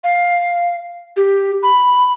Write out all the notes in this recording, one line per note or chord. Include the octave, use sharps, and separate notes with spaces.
F5
G4
B5